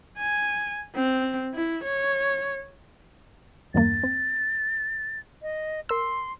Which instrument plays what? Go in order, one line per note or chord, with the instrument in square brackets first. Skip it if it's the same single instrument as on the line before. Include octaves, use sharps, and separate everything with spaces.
[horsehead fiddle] G#5
C4
E4
C#5
[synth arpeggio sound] E2 G2 A#3 [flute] A6
[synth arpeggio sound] C4
[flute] D#5
[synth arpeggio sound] A#4 E6 [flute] C6